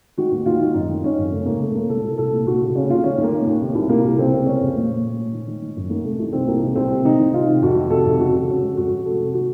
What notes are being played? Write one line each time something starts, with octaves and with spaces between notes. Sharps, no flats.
D#3 F#4
D#2
D#2 F4
D#3
F#2 D#4
D#3
D#3 C#4
F#2
C#3 A3
C#2 A#3
C#3 A3
C#2 A#3
C2 A4
C2
C2 A4
A#2
D#2 F#4
C#3
C#3 C#4
D#2 F4
D#3 C#4
D#2
A#3
D#2
D#2
C3
C2
C2 A#3
C2
C#3 C4
C#3
C#3 C#4
F2
A#2
A#2
A#2
A#2
D#3
D#3
D#3
F#2
D#3 A#3
C3 A3
C2
D#3 C4
C2 A#3
C2
C2 C4
C3
D#3 D#4
D#3
C3 F4
C3
F2 F#4
D#3
C3 A4
F2
C#3 F#4
C#3
C#3 C#4
C#2
F2 F#4
F2
C3 A4
C3
D#3 F#4